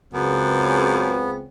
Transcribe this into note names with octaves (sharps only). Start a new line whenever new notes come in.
C#2 F#2 C#3 B3 C4